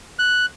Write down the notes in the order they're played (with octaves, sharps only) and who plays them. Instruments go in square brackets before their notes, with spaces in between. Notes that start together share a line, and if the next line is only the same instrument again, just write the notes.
[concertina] F#6